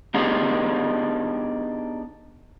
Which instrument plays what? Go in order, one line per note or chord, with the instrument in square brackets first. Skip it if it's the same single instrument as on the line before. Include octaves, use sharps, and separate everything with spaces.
[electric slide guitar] B3 D4 D#4 G4 G#4